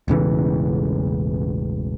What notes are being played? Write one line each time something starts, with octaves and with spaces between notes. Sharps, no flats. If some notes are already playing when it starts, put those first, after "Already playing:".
E1 A1 C#3 E3